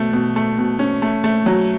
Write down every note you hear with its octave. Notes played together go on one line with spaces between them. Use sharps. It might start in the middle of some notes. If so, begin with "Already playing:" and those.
Already playing: B2 A3
B2
A3
B2
C#4
A3
A3
F#3